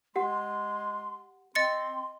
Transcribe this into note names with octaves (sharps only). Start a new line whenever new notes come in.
G#3 G4 F#5 C6
C4 D#5 C6 A6 C#7